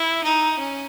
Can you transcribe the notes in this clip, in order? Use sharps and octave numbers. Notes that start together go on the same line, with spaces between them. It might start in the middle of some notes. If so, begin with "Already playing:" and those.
Already playing: E4
D#4
C#4